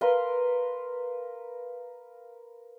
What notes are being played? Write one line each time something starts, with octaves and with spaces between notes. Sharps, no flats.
A#4 B4 F5 C6